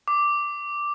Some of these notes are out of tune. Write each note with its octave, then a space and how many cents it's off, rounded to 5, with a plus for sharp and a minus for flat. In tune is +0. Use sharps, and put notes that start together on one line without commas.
D6 +0